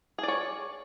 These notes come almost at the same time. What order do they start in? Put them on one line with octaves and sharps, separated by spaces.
G#4 D5 C#5